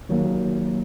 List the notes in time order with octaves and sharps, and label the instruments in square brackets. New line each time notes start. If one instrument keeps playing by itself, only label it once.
[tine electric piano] D#3 F#3 A#3